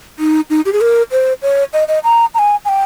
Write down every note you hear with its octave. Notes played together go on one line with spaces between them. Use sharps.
D#4
D#4
G4
G#4
A#4
C5
C#5
D#5
D#5
A#5
A#5
G#5
G#5
G5